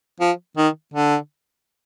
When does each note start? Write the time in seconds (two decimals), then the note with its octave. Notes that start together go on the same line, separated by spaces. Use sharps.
0.20 F3
0.57 D#3
0.94 D3